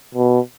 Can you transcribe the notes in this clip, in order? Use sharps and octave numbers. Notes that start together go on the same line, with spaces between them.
B2